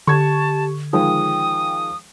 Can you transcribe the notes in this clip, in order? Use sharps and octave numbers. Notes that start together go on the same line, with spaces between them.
D3 G4 A5 C#6 G#6
D#3 F3 G#3 G5 D#6